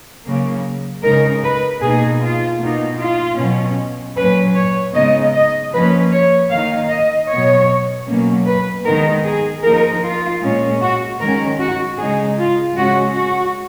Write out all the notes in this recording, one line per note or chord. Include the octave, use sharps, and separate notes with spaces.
C#3 F#3 A#3
C#3 G#3 D#4 A#4
B4
B2 A#3 D#4 G#4
F4
B2 A#3 D#4
F4
B2 F#3 C#4
A#2 F#3 C#4 B4
C#5
C#3 G#3 B3 D#4 D#5
D#5
F3 A#3 C#4 B4
C#5
D#3 A#3 D#4 F5
D#5
B2 F#3 B3 C#5
B2 F#3 A#3 C#4
B4
D#3 G#3 B3 D#4 A#4
G#4
F3 A#3 D#4 A#4
F4
A#2 G#3 C#4
F#4
D#3 G#3 C#4 A#4
F#4
C#3 G#3 D#4 G#4
F4
C#3 G#3 C#4 F#4
F#4